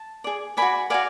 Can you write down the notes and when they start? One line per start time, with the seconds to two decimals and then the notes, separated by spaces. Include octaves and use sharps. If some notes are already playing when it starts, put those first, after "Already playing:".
Already playing: A5
0.24 G#4 D5
0.57 B4 D5 G#5 B5
0.62 F#4
0.90 F#4 B4 D5 F5 G#5